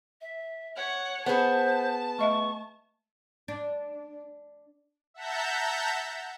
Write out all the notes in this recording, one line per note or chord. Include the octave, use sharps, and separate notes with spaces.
E5
C#5 F#5
B3 G#4 C5 A5
A3 D#5 E5 C#6
D4
E5 F#5 A5 A#5 G6